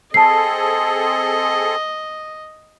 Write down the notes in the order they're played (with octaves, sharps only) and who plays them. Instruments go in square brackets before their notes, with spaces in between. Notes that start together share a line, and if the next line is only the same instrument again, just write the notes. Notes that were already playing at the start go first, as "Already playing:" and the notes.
[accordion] C4 G#4 A4 [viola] D#5 [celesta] A5 C7